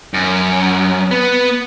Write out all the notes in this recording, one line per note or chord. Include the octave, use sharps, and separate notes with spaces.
F#2
B3